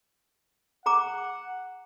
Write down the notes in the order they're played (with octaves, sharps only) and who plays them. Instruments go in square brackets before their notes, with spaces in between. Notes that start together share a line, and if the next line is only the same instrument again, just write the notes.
[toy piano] G#4 A#5 D6 [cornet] F#5